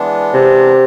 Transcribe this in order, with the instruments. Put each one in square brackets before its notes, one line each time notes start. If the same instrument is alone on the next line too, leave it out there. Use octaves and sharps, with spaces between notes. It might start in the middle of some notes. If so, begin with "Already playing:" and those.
Already playing: [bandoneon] E3 G#3 B3 D4
[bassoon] C3